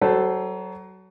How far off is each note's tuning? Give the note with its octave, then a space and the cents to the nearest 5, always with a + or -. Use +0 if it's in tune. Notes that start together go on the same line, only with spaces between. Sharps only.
F#3 +30 A4 +0 C5 +0